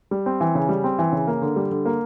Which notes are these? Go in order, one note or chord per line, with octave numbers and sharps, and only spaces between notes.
G3
C4
E3
C#3
G3
C4
E3
C#3
A#3
D3
G3
D3
A#3